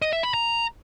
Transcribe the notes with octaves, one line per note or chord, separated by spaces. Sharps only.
D#5
E5
B5
A#5